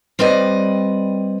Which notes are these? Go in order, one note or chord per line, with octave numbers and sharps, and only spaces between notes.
G3 C4 B4 D5 D#5